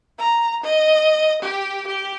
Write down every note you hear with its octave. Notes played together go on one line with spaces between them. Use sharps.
A#5
D#5
G4
G4